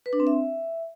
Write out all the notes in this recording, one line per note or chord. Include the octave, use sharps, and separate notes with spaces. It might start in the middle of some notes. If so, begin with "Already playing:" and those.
B4
D4
C4
E5